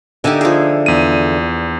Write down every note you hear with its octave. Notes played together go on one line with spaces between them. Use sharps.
D3 A#3 D#4 G4 E5 G#5
F3 G#4
E2 D#7